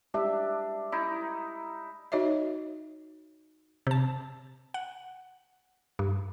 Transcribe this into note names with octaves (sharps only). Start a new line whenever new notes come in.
G#3 D4 G4 E5
D#4 E4
D#4 F#4 C#5 D#5 E5
C3 A5
F#5
G2